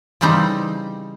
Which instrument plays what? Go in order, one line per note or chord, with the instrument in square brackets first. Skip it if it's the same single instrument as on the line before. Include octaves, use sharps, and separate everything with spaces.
[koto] C#3 E3 G3 C4 D#4